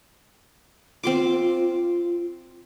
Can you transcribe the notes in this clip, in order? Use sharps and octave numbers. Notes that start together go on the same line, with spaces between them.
C4 F4 C6 D6